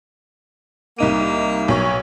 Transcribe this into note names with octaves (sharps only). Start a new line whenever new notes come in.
C2 A#3 D#4 D#7
B1 C#5